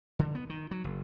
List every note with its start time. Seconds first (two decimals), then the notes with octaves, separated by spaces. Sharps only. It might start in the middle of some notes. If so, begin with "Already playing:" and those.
0.19 D3
0.35 B3
0.50 D#3
0.71 F#3
0.84 F#1